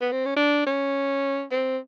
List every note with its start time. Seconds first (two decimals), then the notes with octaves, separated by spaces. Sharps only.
0.01 B3
0.12 C4
0.25 C#4
0.36 D4
0.66 C#4
1.52 C4